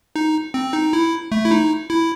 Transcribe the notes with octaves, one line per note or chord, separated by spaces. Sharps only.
D#4
C4
D#4
E4
A3
E4
D#4
E4